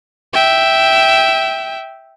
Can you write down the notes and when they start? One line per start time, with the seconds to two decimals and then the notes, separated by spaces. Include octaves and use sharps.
0.33 E5 G5